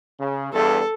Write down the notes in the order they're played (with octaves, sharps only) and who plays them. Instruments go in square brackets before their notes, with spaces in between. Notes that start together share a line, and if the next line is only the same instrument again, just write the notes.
[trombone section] C#3
[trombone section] E2 G2 [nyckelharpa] A4